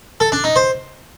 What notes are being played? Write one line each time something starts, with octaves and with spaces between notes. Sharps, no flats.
A4
D4
D#4
C5